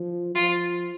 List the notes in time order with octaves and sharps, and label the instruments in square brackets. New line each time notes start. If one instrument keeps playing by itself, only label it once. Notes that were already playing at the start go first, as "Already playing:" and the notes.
Already playing: [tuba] F3
[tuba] F3 [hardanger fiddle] F4